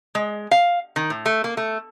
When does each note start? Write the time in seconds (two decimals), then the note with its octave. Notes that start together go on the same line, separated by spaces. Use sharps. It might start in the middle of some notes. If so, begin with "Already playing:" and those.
0.15 G#3
0.51 F5
0.96 D#3
1.10 A2
1.26 A3
1.44 A#3
1.57 A3